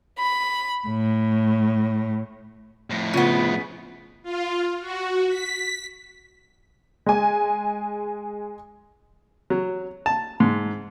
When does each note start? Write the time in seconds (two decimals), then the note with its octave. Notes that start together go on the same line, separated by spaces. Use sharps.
0.19 B5
0.88 A2
2.90 F2 A2
3.14 C#3 B3 F4
4.23 F4
4.80 F#4
5.28 B6
7.06 G#3 G#5
9.50 F#3
10.06 A5
10.40 G#2